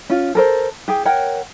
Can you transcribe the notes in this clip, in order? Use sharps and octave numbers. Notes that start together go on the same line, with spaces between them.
C#4 F4
A4 A#4 C5
G4 G#4 G5
A#4 C#5 F#5 G5